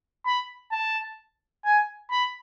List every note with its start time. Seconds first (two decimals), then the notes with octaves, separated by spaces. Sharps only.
0.26 B5
0.72 A5
1.65 G#5
2.11 B5